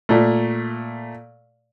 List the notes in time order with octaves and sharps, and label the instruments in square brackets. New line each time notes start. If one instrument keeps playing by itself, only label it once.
[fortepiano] A#2 A3